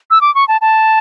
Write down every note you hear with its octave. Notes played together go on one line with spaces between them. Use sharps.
E6
D6
C#6
A5
A5